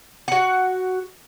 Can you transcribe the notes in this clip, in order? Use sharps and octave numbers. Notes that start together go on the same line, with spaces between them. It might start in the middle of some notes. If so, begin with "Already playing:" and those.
F#4 F#5